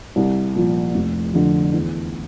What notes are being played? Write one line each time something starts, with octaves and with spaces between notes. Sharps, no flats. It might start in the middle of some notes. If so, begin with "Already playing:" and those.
C2
A#2 F3
F1
F2 D3
E2